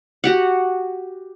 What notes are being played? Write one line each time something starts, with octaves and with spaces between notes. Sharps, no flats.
F#4 G4 F#5